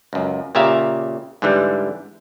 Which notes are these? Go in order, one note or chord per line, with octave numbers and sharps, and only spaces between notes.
C#2 F#2
A#2 C#3 G4 E5 F5 A#5
G#2 D3 E3 G3